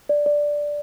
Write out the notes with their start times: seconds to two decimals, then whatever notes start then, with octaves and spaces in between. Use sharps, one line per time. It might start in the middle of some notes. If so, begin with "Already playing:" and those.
0.09 D5
0.26 D5